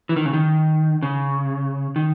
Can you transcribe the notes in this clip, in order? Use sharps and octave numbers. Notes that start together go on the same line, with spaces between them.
E3
D#3
C#3
D#3
C#3
D#3